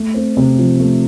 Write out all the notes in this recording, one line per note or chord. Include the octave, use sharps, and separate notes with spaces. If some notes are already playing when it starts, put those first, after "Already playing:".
Already playing: A3
C4
C3
F3
A3